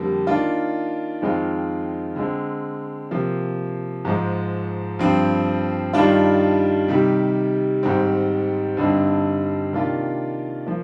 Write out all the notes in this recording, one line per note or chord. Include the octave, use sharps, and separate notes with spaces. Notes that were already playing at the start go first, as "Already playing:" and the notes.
Already playing: F2 D3 G3 A#3
D#3 A#3 D4 F4
F2 D#3 G#3 C4 F4
D3 G#3 C4
C3 F3 A#3
G#2 F3 G#3
G2 F3 C4
G2 D#3 G3 D4 F4
C3 D#3 G3
G#2 D#3 G3 C4
G2 D3 G3 C4 D#4
C3 D#3 A#3 D4 F4
F3 A#3